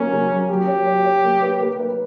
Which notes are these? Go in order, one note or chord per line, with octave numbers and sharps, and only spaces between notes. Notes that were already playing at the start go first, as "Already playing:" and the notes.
Already playing: F#3 A#3 C#4
C#3
F#3
F#3 G4
C#5
C#5
C#5
A#3
B4
A#3
B4